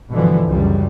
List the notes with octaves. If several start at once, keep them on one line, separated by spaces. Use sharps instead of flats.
G2 B2 D3 E3 F3
C#2 F#2 G3